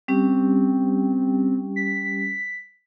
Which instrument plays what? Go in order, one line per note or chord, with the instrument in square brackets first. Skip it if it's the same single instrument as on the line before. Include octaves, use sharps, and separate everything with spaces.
[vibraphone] G3 C#4 G4 [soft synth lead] C4
[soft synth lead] B6